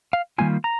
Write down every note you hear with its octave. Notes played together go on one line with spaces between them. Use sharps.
F5
D#3 G3 A#3 F4 G#5
A#5